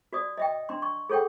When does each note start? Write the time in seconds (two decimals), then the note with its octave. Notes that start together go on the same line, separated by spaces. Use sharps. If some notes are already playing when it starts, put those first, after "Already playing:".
0.13 F#4 D5 D#6
0.37 D#5 E5 G5
0.69 D4 C6
0.82 C#6
1.09 G#4 A4 C#5 F#5 G5